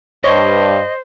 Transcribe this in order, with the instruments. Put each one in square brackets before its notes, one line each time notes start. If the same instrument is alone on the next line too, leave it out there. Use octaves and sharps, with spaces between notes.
[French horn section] G2 [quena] C5 [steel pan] C#5 [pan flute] D#5